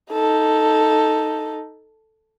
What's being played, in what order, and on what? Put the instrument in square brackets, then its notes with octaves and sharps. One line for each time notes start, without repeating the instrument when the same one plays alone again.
[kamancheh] D#4 A4